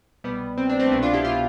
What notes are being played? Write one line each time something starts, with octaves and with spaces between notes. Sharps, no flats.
C2 B2 G3 B3
C4
D4
A3 C4
C2 B2 B3 D4
D4 F4
E4 G4
D4 F4